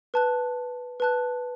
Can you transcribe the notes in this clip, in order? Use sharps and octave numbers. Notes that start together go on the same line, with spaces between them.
B4 A5 F#6
B4 A5 F#6